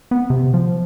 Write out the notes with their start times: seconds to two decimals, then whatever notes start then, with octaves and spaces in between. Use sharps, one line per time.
0.11 B3
0.30 C3
0.54 F3